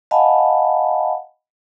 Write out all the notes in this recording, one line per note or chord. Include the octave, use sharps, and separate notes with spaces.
D#5 F5 F#5 G#5 A5 B5